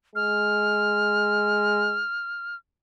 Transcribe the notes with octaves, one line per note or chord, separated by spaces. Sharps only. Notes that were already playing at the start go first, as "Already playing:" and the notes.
G#3 F6